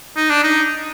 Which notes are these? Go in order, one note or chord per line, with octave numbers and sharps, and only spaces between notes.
D#4
D4
D#4